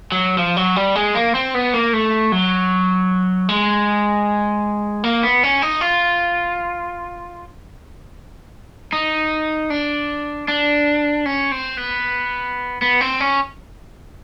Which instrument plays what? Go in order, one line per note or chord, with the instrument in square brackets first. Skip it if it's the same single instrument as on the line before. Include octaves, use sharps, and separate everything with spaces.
[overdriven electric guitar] F#3
F3
F#3
G3
G#3
A#3
C4
B3
A#3
A3
F#3
G#3
A#3
B3
C#4
D#4
F4
D#4
D4
D4
C#4
C4
B3
B3
C4
C#4